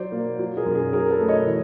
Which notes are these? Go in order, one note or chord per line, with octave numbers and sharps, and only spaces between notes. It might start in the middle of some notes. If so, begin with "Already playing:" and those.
Already playing: F#3 C5 D5
A#3
F#3
G#4 A#4
F#2
G#4
F#3 G#4 A#4
A4 B4
A3
C#5 D#5
E3